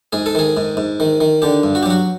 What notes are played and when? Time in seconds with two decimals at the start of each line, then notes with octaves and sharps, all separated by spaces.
0.13 G#2 G#4
0.26 A4
0.35 D#3 G#4
0.57 G#2
0.77 G#2
1.00 D#3
1.21 D#3
1.42 D3 G4
1.63 G2
1.75 F#4
1.83 G4
1.86 F#3 F#4